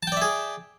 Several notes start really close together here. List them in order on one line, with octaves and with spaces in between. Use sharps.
A5 G5 D5 E5 G#4